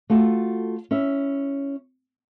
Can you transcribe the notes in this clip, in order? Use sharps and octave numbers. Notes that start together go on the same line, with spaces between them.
A3 F4 F#4 A4
C#4 E4 E5